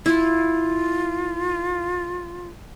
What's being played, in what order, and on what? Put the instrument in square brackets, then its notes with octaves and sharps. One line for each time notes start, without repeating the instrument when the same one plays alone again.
[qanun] E4 [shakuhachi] F4